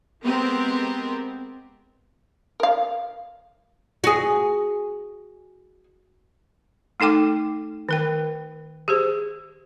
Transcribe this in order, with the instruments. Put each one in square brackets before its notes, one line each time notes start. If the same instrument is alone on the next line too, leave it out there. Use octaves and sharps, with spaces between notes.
[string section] G#3 B3 C4 G4 A#4
[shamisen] A#4 F5
[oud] F#4 G#4
[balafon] A3 D#4 A4 G5 D6
D#3 A#4 G5
G4 G#4 C5